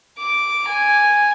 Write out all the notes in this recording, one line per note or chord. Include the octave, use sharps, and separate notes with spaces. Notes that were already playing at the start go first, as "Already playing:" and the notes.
D6
G#5